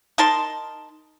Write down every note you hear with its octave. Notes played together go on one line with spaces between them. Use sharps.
D#4 A#4 A5 C6